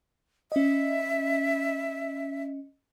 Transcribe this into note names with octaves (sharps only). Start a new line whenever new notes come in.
C#4 D#5 E5